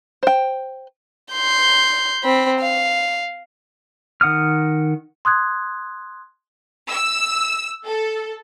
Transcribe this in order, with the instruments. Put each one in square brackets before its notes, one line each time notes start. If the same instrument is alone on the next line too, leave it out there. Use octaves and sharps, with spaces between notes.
[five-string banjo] C5 G5
[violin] C6 G6
C4 B5
F5
[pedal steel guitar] D#3 F#5 D#6 F6
[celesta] C6 D#6 F#6 G#6
[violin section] E6
A4